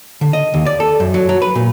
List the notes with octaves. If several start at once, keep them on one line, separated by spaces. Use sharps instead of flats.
D3
D#5
D#2
D5
A4
F#2
F#3
F#3
B4
A#2